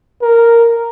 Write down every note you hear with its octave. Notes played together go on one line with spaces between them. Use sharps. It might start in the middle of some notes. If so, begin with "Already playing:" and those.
A#4